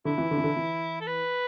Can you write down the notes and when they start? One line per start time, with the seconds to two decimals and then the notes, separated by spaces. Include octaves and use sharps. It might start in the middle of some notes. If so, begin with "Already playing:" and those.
0.05 D3 E4
0.18 E3
0.31 D3
0.37 E3
0.44 D3
0.56 E3
1.01 A4
1.07 B4